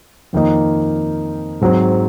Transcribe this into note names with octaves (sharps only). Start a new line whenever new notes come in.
F2 D#3 A#3 D#4
G#2 F#3 C4